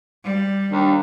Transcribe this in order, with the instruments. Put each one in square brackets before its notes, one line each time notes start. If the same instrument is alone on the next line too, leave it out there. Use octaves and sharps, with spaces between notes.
[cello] G3
[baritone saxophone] D#2 [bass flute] D4